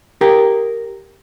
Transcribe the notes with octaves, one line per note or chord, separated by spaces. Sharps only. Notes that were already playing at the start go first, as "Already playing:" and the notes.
G4 A#4 G5